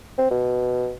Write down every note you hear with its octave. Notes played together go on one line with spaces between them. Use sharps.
C4
B2